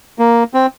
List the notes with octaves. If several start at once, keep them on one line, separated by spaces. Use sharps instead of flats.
A#3
C4